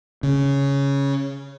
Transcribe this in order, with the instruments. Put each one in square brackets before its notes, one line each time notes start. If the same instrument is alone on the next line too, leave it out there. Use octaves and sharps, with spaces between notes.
[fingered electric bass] C#3